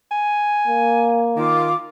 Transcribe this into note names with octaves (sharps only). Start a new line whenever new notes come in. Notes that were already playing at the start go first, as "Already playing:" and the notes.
G#5
A#3
D#3 F4 D6